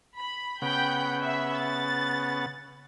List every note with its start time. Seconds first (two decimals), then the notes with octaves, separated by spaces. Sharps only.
0.16 B5
0.62 C#3 B3 F#5 G5 B5 G6
1.23 E5
1.56 A6